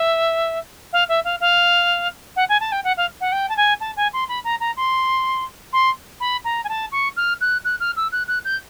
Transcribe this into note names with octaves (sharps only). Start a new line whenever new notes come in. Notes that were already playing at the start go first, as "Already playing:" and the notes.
Already playing: E5
F5
E5
F5
F5
F#5
G#5
A5
G5
F#5
F5
F#5
G5
A5
G#5
A5
G#5
C6
B5
A#5
A#5
C6
C6
B5
A#5
G#5
A5
C#6
F6
F#6
F#6
F6
E6
F#6
F#6
G6